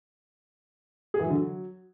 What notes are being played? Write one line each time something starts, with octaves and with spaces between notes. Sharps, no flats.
G#4
E3
F#3
D3
F#3